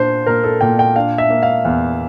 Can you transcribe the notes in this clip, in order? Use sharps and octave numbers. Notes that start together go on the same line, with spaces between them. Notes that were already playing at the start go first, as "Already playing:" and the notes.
Already playing: A#2 D4 C5
A#2 A#4
A4
A#2 G5
G5
D4 F5
E5
A#3
F5
E2